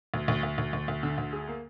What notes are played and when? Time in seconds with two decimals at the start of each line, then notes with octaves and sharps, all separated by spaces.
0.14 D2
0.28 D2
0.43 D2
0.58 D2
0.73 D2
0.88 D2
1.03 D3
1.18 D2
1.33 G#4
1.48 A#3